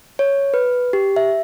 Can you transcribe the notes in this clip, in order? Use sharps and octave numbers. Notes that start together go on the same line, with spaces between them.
C#5
B4
G4
E5